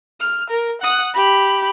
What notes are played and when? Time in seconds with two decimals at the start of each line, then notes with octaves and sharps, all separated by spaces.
0.20 F6
0.50 A#4
0.81 F#5 D#6
1.14 G4 B5